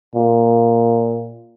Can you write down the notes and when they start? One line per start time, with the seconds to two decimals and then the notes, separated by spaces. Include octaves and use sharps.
0.15 A#2